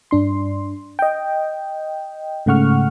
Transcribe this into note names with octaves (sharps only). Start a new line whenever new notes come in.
G2 D4 C6
D#5 G5
G#2 C#3 A3 F#5 C#6 F6